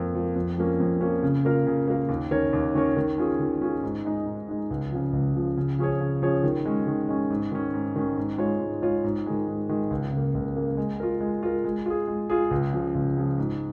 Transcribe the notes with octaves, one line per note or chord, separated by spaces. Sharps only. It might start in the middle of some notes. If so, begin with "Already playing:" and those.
Already playing: F2 F3 A#3
F3 A#3
F2
F3 A#3 C#4
F2
F3 A#3 C#4
C#3
A#3 F4 A#4 F5
C#3
A#3 F4 A#4 F5
D#2
D#3 C#4 A#4 C#5
D#2
D#3 C#4 A#4 C#5
D#3
C#4 F4 G#4
D#3
C#4 F4 G#4
G#2
G#3 D#4
G#2
G#3 D#4
C#2
C#3 F3
C#2
C#3 F3
C#3
F3 C#4 G#4 C#5
C#3
F3 C#4 G#4 C#5
D#3
G#3 C#4
D#3
G#3 C#4
G#2
D#3 C#4
G#2
D#3 C#4
G#2
G#3 F4 C#5
G#2
G#3 F4 C#5
G#2
D#3 G#3
G#2
D#3 G#3
C#2
C#3
A#3
C#2
C#3 A#3
G#3
F4 A#4
G#3
F4 A#4
G#3
F4 G#4
G#3
F4 G#4
C#2
C#3 F3
C#2
C#3 F3
G#2